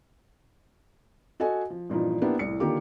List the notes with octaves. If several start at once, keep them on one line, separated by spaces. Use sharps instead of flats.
F#4 A4 D#5 G#5
F3
G2 A#2 E3 F3 D#4
A#3 B3 D4 E4 G4
C2 A2 C#7
D3 D#3 A#3 F4 G4 D6